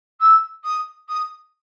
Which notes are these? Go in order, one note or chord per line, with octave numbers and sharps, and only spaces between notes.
E6
D#6
D#6